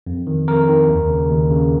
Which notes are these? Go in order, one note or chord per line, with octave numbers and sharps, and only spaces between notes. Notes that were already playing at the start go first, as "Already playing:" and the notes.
F2
D#3
F2 A#4
D#3
D#2
C#3
D#2
C#3